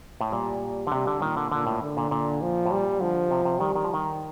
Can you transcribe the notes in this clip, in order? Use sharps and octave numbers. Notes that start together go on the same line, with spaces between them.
A2
A#2 G3
D3
C3 G3
D3
A#2 D#3
D3
A#2 D3
A2
D3
A#2
A#2
F3
A2
A#2 G3
D3 F3
C3
C3
D#3 G3
D#3
F3
D#3